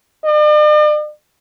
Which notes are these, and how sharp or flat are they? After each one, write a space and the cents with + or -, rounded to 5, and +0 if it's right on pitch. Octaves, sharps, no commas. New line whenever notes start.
D5 +45